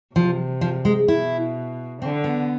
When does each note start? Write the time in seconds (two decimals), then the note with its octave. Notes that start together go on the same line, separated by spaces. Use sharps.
0.15 C3 F3
0.61 F3
0.85 G#3
1.08 B2 E4
2.02 D3 C4
2.24 B3